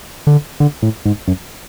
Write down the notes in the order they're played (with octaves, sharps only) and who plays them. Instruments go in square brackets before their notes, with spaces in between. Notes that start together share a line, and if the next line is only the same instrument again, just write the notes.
[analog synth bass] D3
D3
A2
G#2
F#2